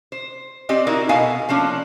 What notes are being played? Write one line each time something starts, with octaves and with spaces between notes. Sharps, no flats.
C5
C4 G4 D5 D#5
D#4 E4 F#4 A#4
B2 B3 A4 D#5 F5 G#5
F3 A#3 C#4 D4